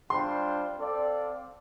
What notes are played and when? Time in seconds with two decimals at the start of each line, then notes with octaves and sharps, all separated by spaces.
0.10 G3 D4 F4 C5 G5 C6
0.78 C4 A4 D5 F5